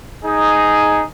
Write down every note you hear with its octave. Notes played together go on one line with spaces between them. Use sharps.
D#4 G#4